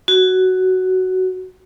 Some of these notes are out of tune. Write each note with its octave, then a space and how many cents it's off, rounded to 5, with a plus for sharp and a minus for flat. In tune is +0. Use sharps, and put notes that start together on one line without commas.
F#4 +10